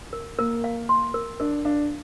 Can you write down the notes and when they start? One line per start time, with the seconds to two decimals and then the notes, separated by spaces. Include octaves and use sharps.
0.13 A#4
0.39 A#3 A#4
0.64 F5
0.89 C6
1.14 A#4
1.40 D4 A#4
1.65 D4 F5